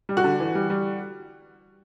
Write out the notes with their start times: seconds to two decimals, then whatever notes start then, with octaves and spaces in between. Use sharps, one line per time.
0.09 G3
0.17 F#4
0.24 D3
0.40 E3
0.55 G3
0.70 G3